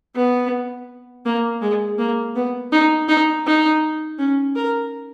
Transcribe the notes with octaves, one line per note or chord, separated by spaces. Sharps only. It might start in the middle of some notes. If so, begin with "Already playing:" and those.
B3
A#3
G#3
A#3
B3
D#4
D#4
D#4
C#4
A#4